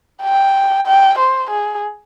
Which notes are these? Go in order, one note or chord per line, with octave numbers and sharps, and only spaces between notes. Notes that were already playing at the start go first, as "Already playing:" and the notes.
G5
G5
C5
G#4